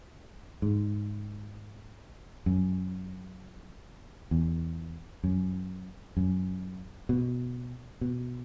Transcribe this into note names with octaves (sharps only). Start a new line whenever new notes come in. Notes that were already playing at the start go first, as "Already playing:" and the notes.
G#2
F#2
E2
F#2
F#2
B2
B2